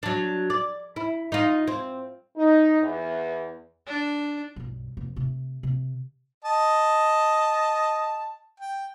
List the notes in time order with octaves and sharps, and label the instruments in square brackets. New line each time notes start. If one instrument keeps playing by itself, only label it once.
[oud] F#3 D4
D5
E4
D#4 F4
C4
[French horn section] D#4
E2
[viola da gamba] D4
[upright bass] B1 G2
F1
C3 A3
C3
[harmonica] D#5 A5
G5